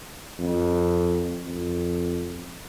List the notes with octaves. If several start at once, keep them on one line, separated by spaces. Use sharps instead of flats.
F2
F2